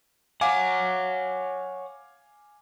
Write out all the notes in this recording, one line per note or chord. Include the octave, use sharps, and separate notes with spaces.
C#5 F5 F#5 G#5 D6